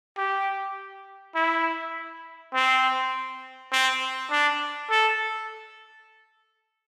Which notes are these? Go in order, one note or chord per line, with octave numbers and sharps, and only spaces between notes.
G4
E4
C4
C4
D4
A4